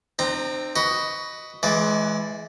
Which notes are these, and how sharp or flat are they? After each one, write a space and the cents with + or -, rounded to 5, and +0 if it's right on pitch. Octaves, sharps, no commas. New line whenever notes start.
C4 +0 D#4 -45 A#5 +0
F#4 +15 B4 +0 D#5 +0
E3 +0 G#3 +30 D5 +0